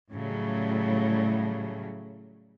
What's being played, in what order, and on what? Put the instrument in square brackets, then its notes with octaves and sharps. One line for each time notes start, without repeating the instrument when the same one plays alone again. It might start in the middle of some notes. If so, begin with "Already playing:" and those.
[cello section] A2 C#3 F#3 G3